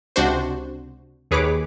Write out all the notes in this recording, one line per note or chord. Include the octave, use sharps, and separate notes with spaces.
C#2 C3 D4 F#4 C5
D#2 G#4 B4 C#5 D6